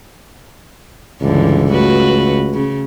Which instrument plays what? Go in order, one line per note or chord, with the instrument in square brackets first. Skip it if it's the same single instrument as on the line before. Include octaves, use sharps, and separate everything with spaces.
[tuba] C#2 [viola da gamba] G2 D3 E3
[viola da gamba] A3 F#4 B4
C#3